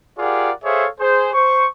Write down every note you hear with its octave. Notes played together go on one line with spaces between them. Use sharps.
F4 G4 G#4 A#4 D5 F#5
G#4 A4 C5 C#5 E5 F5
G#4 C5
C5 C#6